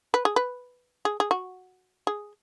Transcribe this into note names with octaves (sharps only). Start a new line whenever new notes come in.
B4
G#4
B4
G#4
G#4
F#4
G#4